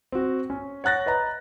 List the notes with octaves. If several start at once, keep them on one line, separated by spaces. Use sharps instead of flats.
C4 F#4
C#4
C#5 F#5 F#6 A6 A#6
B4 D#5 A#5